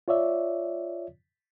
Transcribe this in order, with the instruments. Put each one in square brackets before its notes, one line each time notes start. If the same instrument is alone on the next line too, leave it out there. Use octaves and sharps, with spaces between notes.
[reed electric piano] F4 C#5 D5 E5